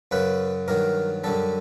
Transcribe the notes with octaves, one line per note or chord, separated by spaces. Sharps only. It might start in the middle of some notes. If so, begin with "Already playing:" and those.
F#2 C#3 F#3 B4
G2 D#3 F#3 A#4
F#2 D3 G3 A4